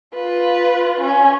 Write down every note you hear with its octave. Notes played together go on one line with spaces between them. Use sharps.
F4 B4
C#4